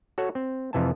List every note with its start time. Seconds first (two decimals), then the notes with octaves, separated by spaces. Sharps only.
0.18 F#4 A4 C#5 F#5
0.35 C4
0.73 F2 C3 E3 G#5 A5